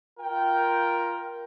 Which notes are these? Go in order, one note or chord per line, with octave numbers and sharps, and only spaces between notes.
F4 A#4 G5